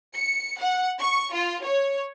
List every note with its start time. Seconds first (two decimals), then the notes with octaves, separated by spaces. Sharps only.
0.16 C#7
0.59 F#5
1.00 C#6
1.34 F4
1.64 C#5